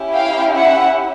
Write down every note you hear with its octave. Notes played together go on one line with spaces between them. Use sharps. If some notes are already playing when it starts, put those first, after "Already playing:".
Already playing: C#4 E4 G4
F5 G5
E5 F#5